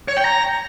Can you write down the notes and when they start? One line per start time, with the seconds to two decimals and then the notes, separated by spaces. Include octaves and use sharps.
0.08 C#5
0.17 G5
0.25 A#5